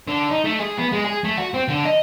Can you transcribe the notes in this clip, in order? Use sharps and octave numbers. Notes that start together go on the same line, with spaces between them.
D3
D#4
A3
G#4
B3
G#3
G#4
A3
F#4
C4
D3
D#5